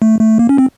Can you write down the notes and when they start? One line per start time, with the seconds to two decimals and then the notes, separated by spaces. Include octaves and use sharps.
0.02 A3
0.21 A3
0.39 A#3
0.49 C#4
0.58 C4